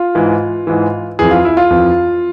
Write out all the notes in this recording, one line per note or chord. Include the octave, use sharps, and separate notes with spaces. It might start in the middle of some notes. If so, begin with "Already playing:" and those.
Already playing: F4
G#2 E3
G#2 E3
F2 E3 G#4
F4
E4
F4
F2 E3